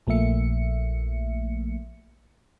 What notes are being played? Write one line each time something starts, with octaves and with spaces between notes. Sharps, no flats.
A#1 F3 A3 A#3 E5 C#7